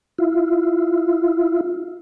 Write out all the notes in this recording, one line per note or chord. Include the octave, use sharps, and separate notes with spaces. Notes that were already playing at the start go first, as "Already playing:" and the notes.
E4 F4